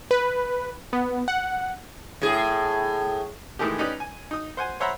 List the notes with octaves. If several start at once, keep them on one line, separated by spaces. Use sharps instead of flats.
B4
B3
F#5
A2 G#4
A2 D#3 E3 G#3 A3 G4
C#4 D#4 G4 B4 D5
G#5
D#4 D#6
C5 F#5 G#5
C5 C#5 E5 F#5 A#5 B5